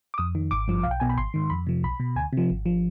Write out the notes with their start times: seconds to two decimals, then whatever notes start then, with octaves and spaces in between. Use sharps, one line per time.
0.14 D6
0.18 F2 D#6
0.35 D#3
0.51 G#1 D6
0.68 G2 F3
0.83 B1 F5
0.91 G5
1.00 B2 G#5
1.09 B5
1.17 G#1 C6
1.34 G#2 D#3
1.50 F2 B5
1.67 C3 F3
1.83 B1 B5
2.00 B2
2.16 D2 G#5
2.33 C3 F3
2.50 G#1
2.66 F3